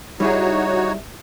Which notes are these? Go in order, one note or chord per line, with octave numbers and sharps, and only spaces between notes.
G3 D#4 E4 F#4 G#4 C#5